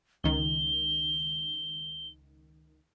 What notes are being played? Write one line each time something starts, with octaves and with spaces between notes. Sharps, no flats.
C#2 D#3 G7